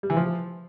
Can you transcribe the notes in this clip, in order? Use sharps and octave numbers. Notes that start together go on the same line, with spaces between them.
G3
E3
F3